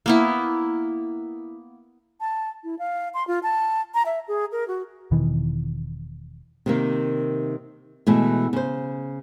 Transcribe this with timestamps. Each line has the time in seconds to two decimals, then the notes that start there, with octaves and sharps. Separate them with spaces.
0.06 A#3 B3 E4
2.21 A5
2.64 E4
2.79 F5
3.14 C6
3.27 F4
3.43 A5
3.94 A#5
4.06 E5
4.28 G#4
4.52 A#4
4.68 F#4
5.11 E1 B2 D#3 E3
6.66 C3 D#3 A#3
8.07 B2 E3 G#3 A3
8.53 C#3 C5